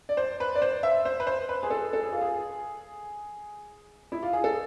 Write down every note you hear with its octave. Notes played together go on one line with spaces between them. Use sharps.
D5
C5
B4
D5
C5
E5
C5
B4
C5
B4
G#4
A4
A4
G#4
F4
G#4
E4
F4
G#4
A4